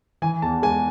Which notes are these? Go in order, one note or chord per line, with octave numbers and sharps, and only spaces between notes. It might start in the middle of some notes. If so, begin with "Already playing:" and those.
E3 G#5
E2 A5
G#3 G#5